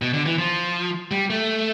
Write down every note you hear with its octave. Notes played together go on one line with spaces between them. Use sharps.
B2
D3
E3
F3
G3
A3